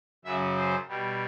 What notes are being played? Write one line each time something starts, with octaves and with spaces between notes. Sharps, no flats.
F#2 C#3 F#3 E5
C5
B2 G3